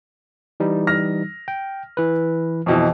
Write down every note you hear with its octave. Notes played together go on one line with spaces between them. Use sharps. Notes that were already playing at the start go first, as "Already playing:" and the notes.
E3 G3 D#4
F6 A#6
G5
E3 B4
F2 B2 E3